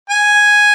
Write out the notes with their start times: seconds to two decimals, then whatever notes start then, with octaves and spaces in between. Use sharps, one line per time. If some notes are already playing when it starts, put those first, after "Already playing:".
0.10 G#5